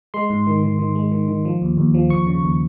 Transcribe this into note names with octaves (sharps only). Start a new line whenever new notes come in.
G#3 C6
G#2
D#3
D#3
D#3
G#3
D#3
D#3
F3
D#2
D#2
F3
D#2 C#6
C#3
D#2